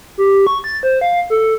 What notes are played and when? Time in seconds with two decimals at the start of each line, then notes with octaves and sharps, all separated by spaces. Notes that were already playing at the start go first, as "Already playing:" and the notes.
0.18 G4
0.47 C#6
0.64 A6
0.83 C5
1.01 F5
1.30 A4